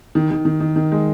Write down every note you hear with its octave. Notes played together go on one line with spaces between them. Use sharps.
D#3
D#3
D#3
D#3
D#3
G#3